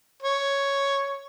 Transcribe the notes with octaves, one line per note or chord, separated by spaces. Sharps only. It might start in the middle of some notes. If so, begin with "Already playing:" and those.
C#5